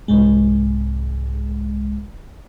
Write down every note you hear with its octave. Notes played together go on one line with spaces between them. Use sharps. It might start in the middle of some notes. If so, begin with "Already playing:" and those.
C2 G#2 G#3